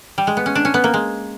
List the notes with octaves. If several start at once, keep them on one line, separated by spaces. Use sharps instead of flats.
G3
G#3
B3
C#4
D4
C#4
B3
A#3
G#3